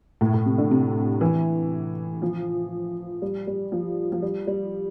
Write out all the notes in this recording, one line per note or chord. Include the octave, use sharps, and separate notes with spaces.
A2
A2
C3
D3
C3
E3
F3
G3
G3
F3
F3
G3
G3